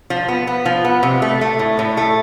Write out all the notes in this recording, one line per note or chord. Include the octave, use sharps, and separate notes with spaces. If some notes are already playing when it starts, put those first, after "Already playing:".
F3
B3
B3
F3
B3
C3
A3
A3
A2
A2
A3